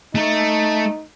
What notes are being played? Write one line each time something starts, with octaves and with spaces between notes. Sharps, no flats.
A3 D#4